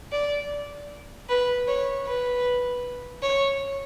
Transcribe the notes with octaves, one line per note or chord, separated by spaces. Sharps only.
D5
B4
C#5
B4
C#5